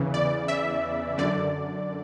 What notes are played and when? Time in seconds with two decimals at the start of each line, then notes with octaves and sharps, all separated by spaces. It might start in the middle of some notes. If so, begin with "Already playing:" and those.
Already playing: E2 C#3 E3
0.14 D5
0.48 E5
1.18 F#2 D3 D5